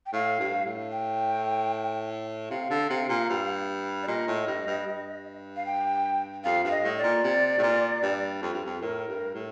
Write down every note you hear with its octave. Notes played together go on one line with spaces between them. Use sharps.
G5
A2 F5
G2
A2
G5
C3 F5
D3
C3
A#2
G2
D5
A#2 D#5
A2
G2
G2
G2
F5
G5
F2 F5
G2 F5
D#5
A2
D5
A#2
C3
A2
A#2
G2
F2
G2
F2
A2 A#4
G2
A2